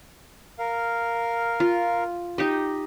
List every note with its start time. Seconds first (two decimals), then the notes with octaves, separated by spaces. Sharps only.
0.59 A#4 F5
1.60 F4
2.38 D#4 G4 D#5